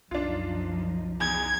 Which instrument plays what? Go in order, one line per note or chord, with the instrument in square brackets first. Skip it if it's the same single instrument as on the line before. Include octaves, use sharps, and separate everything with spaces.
[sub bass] C2 [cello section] F#2 F3 D#4 [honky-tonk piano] D4 F4
[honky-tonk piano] E2 [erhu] G#6